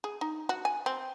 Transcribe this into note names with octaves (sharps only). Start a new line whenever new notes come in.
G#4
D#4
F#4
G#5
C4